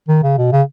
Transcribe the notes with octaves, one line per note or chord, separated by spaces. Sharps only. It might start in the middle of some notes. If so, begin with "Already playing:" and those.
D#3
C#3
B2
C#3